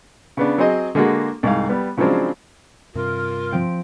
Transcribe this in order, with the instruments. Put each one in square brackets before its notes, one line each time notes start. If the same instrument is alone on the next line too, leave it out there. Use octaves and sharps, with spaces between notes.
[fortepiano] C#3 B3 D4
F#3 C4 G#4 C5 D#5
D3 G#3 A#3 F#4
C2 G#2 F5
G3 B3
C#3 F3 F#3 G#3 C4 D4
[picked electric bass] G2 C3 [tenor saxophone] F4 [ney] A#4
[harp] F3 C4 D7